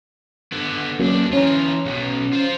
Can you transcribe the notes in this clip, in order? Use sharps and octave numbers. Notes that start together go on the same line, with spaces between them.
D3 B3
C#2 F#3 A#3 C#4 D4
E3 C#4 F4 A#5
B1 B2
F4 C5